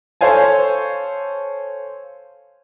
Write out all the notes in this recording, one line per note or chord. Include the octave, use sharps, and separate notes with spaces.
A4 C5 C#5 F5 G#5 A5